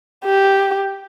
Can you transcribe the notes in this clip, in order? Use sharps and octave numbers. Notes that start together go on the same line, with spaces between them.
G4